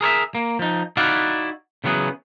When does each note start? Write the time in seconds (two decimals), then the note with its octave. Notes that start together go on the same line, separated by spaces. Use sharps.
0.01 G#4 A#4 C#5 E5
0.35 A#3
0.59 F3 D#4
0.97 D#4 E4 F#4 D5 F5 F#5
1.84 C#3 E3 F#3 B3 G#4